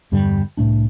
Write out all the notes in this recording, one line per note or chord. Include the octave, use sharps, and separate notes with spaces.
E2 G2 D3 G3
C2 A2 A3 D4